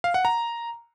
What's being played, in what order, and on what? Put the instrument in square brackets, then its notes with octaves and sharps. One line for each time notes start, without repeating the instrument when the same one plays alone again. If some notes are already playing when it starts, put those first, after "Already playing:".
[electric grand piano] F5
F#5
A#5